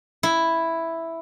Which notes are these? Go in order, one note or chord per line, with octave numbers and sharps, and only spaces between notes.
E4